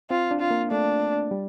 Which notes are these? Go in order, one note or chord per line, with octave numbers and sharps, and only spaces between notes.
C4 F4
D4
F4
A#3
A3 D4
G3